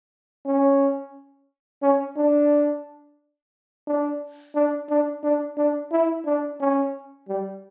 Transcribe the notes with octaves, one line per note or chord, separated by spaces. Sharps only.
C#4
C#4
D4
D4
D4
D4
D4
D4
E4
D4
C#4
G3